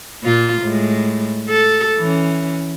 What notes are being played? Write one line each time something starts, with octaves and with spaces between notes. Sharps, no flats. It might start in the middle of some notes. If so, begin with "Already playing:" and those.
A#2 F4
A2 G#3
A4
E3 C#4